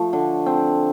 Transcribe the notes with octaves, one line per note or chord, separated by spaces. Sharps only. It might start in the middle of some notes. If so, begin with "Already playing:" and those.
Already playing: F3 A3
D3
C4